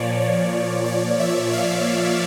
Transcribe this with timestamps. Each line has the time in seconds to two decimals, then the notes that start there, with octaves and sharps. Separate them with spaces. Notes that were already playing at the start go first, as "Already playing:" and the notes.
Already playing: A#2 F3 C#5 D5
0.20 C#5
0.86 D5
1.20 E5
1.53 F5